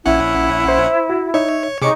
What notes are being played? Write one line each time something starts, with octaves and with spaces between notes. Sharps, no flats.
A#1 C#4 E4 F#5
C5
F#4
D#4 C#5 E5
C3 D#4 G#4 C#5 C#6 D6 C#7